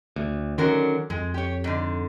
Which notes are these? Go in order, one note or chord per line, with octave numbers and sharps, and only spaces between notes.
D2
D3 D#3 F#3 C#4 A#4
F2 G#3
G4 C#5
G#2 D3